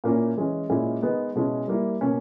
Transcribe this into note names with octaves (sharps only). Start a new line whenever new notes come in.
A#2 A#3 C#4 E4
E3 G#3 C#4
A#2 G#3 C#4 E4
D#3 G#3 B3 D#4
B2 G#3 C#4 E4
G3 A#3 E4
B2 A#3 C#4